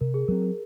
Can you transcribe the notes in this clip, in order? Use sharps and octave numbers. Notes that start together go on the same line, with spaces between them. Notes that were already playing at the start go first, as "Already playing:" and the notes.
C3 A#4
G#4
F#3 C4 A#4
A#4